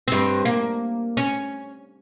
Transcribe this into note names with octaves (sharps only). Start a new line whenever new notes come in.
G2 C4
A#3
C#4